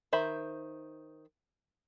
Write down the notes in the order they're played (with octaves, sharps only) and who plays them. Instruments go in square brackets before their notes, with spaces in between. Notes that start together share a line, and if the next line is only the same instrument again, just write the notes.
[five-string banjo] D#3 C5 E5 B5